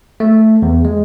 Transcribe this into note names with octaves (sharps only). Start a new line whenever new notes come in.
A3
E2
G#3